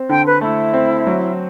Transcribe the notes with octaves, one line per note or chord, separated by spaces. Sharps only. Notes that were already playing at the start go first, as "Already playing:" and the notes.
Already playing: C4
D3 G5
B4
A3 E4
C4
F#3